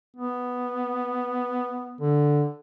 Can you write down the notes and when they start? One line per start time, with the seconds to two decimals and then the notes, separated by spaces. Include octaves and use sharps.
0.17 B3
2.01 D3